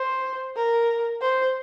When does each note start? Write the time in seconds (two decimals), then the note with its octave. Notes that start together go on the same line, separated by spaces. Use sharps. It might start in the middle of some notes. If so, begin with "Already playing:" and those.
Already playing: C5
0.57 A#4
1.21 C5